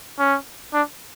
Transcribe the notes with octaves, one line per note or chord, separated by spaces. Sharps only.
C#4
D4